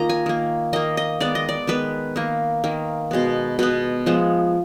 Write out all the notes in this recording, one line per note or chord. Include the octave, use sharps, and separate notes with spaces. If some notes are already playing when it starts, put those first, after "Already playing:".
Already playing: D#3 A#3 F4 D#5 A#5
G#5
D#3 A#3
D#3 A#3 D#5
D#5
D#3 G#3 B3 D5
D#5
D5
D#3 G#3 B3 B4
D#3 A#3
D#3 A#3
B2 G#3 B3
B2 G#3 B3 B4
F3 G#3 B3